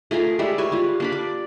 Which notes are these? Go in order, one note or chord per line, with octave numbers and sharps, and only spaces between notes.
A3 F4 G#4 A#4
G3 G#3 E5
B4 C#5 E5 G#5
G3 F4
A#3 D4 B5
D5